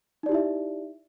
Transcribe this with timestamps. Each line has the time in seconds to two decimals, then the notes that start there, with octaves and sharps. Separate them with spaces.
0.23 D#4
0.26 D5
0.29 G4
0.32 E4
0.35 E5